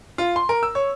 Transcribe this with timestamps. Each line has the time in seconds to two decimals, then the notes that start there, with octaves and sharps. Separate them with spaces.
0.18 F4
0.36 C6
0.49 A#4
0.63 E6
0.75 C#5